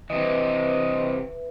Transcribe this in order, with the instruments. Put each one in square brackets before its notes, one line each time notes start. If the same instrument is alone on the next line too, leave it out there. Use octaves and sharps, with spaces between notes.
[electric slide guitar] C3 E3 [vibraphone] B4 E5 [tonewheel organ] D#5